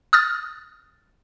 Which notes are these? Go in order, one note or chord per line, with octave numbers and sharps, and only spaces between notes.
D#6 F6 F#6 A6